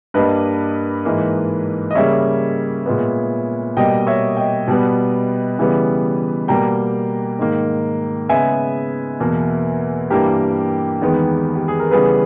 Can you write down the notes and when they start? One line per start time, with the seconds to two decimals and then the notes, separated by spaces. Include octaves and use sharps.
0.14 G2 G3 A#3 B4 D#5
1.05 G#2 E3 A#3
1.91 D#5
1.95 C#3 G3 A#3 C#5 E5
2.86 A#2 G#3 B3
3.77 B2 G3 A#3 D#5 G5
4.07 C#5 E5
4.37 D#5 G5
4.67 B2 G3 B3
5.58 C#3 E3 G3 B3
6.48 B2 G3 A#3 G5 A#5
7.39 G#2 D#3 A#3
8.29 C#3 G#3 B3 E5 G#5
9.20 E2 B2 A#3
10.10 G2 E3 G3 A#3 G4 A#4
11.01 E2 D#3 G#3 B3
11.56 G4
11.68 G#4
11.80 A#4
11.91 C#3 E3 G3 B3 G#4 B4